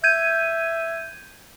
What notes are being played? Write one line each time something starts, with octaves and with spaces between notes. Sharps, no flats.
E5 G6 G#6 D#7